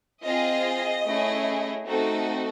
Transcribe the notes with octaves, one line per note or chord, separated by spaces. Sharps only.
C4 F4 G#4 D#5
A3 C#4 E4 G#4
A3 C4 D#4 F#4 A4